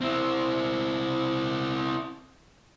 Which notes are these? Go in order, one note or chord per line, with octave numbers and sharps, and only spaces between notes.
C4 E4